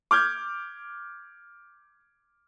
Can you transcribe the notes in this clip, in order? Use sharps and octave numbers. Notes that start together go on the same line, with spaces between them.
D6 F6 G6 G#6